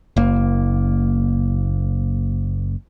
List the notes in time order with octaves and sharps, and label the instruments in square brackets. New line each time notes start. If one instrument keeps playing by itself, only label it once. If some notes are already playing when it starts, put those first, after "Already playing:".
[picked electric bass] F#1 A#3